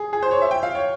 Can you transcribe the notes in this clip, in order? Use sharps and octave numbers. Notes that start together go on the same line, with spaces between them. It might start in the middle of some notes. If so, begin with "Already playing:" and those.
Already playing: G#4
G#4
C5
C#5
E5
G5
F5
C#5